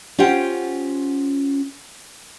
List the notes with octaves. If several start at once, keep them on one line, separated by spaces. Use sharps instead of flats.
C#4 F4 G4 C5 F#5 G5